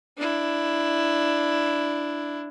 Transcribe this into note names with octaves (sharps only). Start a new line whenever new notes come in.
D4 E4